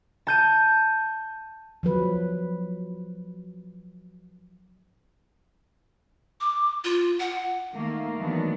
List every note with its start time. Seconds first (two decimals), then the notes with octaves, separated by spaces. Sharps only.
0.27 A5 G6 D#7
1.83 F3 F#3 B4
6.41 D6
6.84 F4
7.19 F#5
7.71 D#3 A3 A#3
8.17 D#3 E3 F#3 A3 B3 D4